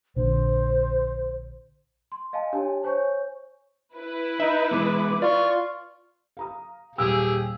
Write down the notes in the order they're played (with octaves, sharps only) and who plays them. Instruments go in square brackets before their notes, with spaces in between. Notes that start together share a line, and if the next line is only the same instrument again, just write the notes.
[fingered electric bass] A#1 D3 [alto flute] C5
[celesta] C6
D#5 F5 G#5 A5
D4 G4 C#5 G#5 A5
C5 C#5 G#5 C#6 G6
[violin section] E4 B4
[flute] D#4 [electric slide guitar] E5
[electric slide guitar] E3 G#3 B3 [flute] D6
[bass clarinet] F4 [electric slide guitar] D5 [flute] C#6
[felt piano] F5 A#5 D#6
[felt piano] D#1 F5 E6 [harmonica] G4 G#4